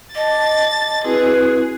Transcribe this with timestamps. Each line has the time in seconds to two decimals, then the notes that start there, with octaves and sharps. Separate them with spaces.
0.15 D#5 A5 D6 A6
1.04 C4 E4 F#4 G#4 B4